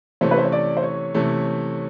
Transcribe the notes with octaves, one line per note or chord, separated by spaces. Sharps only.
C3 E3 A3 C#4 C5
B4
C5
C#5
D5
C5
C#5
C3 E3 A3 C#4